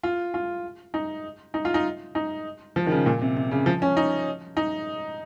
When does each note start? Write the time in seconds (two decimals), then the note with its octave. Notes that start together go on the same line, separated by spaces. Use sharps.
0.03 F4
0.34 F4
0.94 D#4
1.54 D#4
1.65 F4
1.74 D#4
2.15 D#4
2.76 F3
2.87 D#3
2.91 C#3
3.06 A#2
3.21 C3
3.37 C3
3.51 C#3
3.66 F3
3.82 C#4
3.97 D#4
4.57 D#4